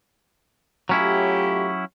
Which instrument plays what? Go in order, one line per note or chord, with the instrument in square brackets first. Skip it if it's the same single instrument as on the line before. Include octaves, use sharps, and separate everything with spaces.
[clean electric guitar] F#3 C#4 E4 [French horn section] A3 F4 G4